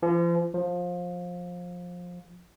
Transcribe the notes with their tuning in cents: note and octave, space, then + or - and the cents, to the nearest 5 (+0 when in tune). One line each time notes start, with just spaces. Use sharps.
F3 -40
F3 +20